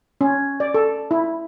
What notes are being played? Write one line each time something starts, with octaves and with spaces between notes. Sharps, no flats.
C#4
D5
A4
E4